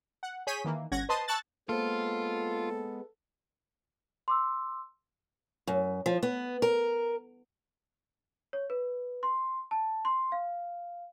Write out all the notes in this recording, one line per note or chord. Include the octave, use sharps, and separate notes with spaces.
F#5
G#4 C#5 G6 B6 D#7
D#3 E3 A#3
G1 C#4 F#5 G#6 A#6
B4 C5 D#5 A5 C6 D#6
A5 C#6 E6 F#6 A6
G#3 A#3 B3 F4 A4 C5
C6 D6 E6
F#2
F3
B3
A#4
C#5
B4
C6
A5
C6
F5